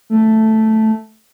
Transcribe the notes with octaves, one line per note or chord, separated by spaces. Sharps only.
A3